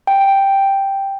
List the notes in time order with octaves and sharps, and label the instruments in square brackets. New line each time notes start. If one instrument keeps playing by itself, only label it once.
[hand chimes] G5